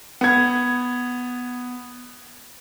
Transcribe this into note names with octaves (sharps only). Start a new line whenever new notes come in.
B3 G#6